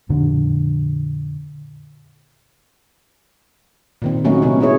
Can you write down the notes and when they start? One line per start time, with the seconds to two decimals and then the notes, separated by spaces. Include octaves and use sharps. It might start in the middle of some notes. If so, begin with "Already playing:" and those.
0.09 F2 A#2 D3
4.02 A#2 D#3 C4
4.24 F#3 A3 A#3 C#4 D#4 F#4
4.42 C3 B3 C#4
4.60 C#4 E4 G#4 C#5